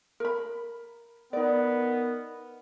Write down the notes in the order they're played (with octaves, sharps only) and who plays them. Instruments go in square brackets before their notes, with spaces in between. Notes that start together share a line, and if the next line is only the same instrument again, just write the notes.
[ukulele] A#4 B5
[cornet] B3 [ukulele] D#4 D5 [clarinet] A#4